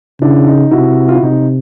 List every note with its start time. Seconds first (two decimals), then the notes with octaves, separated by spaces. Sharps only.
0.21 C#3 D4 E4
0.47 D#4
0.71 C3 E4 F#4
1.08 F4
1.15 E4
1.23 C3 D#4